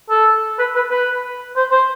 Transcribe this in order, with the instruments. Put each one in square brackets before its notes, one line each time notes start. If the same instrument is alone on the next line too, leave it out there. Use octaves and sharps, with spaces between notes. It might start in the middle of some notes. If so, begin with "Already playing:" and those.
[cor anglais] A4
B4
B4
B4
C5
C5